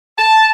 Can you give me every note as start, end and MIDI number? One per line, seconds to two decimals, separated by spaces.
0.19 0.51 81